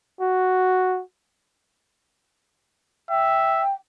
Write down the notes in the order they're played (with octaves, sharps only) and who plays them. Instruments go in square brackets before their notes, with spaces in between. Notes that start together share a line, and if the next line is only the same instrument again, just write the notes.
[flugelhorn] F#4
[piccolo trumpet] E5 [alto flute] G5